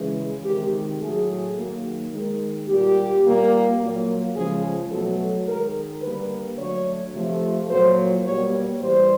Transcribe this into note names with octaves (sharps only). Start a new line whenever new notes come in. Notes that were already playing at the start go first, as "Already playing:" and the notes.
Already playing: C#3 E3 G#3
C3 D#3 G#3 G4
A2 F#3 A3 G#4
D#3 F#3 A#3
D#3 G#3
A#2 G3 A#3 G4
A#2 G3 A#3
A#2 F#3 A#3
C#3 F3 G#3 G#4
B2 F#3 A3 A4
D#3 G#3 A#4
D3 G3 A#3 B4
D3 F#3 A3 C#5
C3 F3 A3
A#2 F#3 A#3 C5
B2 G3 A#3 C#5
A2 E3 G3 C5